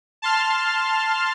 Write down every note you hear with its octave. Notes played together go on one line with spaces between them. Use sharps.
A5 C6 F6